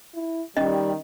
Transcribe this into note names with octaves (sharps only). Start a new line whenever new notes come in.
E4
D#3 G3 C#4 D#5